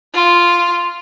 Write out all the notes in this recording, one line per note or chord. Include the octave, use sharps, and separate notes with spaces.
F4